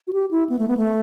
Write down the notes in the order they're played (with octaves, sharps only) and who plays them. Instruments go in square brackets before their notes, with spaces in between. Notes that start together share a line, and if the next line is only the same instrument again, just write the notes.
[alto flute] F#4
G4
E4
B3
A3
B3
A3